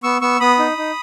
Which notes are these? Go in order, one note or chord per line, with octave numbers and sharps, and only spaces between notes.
B3 C#6 E6
B3 C#6 E6
B3 B5 D#6
D#4
D#4